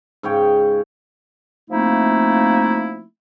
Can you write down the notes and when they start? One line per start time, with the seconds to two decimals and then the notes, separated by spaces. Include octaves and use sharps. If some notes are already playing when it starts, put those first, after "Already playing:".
0.23 G#2 C#3 C#5 G5
1.70 F3 A3 A#3 C4 D#4 E4